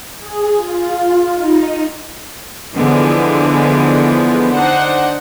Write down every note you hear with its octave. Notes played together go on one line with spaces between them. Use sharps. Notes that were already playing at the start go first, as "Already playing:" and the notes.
G#4
F4
D#4
D3 E3 F3 G#3 B3
D4 D#4 C5 F#5